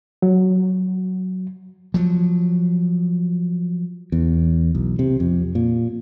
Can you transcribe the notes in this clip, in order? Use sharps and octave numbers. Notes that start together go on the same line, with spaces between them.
F#3
F3 F#3
E2
B1
C3
F2
A#2